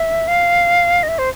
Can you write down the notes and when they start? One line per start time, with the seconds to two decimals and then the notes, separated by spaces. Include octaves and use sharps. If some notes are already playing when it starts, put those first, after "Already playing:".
Already playing: E5
0.28 F5
1.03 D#5
1.08 E5
1.19 C5